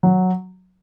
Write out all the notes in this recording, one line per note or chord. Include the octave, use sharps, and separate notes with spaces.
F#3